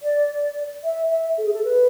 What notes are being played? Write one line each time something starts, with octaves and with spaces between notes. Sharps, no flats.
D5
E5
E5
A4
G#4
A4
B4